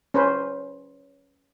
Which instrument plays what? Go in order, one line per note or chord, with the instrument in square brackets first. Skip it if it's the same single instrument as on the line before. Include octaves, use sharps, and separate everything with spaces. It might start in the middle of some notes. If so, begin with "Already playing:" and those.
[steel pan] C#4 B4 C5